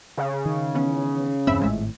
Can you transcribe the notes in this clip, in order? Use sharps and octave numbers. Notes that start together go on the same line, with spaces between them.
C#3
D#3
E3 B3 C#4
E2 G2 C4 E5 B5 E6
G#1 A2 F3 G#3 E5